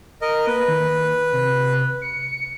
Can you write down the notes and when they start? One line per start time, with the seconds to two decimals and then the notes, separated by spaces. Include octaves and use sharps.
0.22 A#4 D#5
0.47 A#3 B4
0.68 D#3
1.33 C3
2.02 C#7